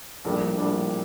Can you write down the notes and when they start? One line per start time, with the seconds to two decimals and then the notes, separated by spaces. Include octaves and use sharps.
0.25 A#1 A2 G3 A#3 D4
0.57 A#1 A2 G3 A#3 D4